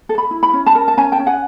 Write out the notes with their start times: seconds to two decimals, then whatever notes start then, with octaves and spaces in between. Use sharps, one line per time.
0.09 A4
0.18 B5
0.31 E4
0.43 B5
0.53 C#4
0.66 A5 B5
0.75 A#4
0.88 A5
0.97 C#4 G#5 A#5
1.12 G5 A5
1.19 C#4
1.27 F#5 G#5